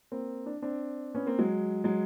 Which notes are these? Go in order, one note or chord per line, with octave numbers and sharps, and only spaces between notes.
A#3 C4
D4
C4 D4
B3 C#4
A#3 C4
F#3 G#3
F#3 G#3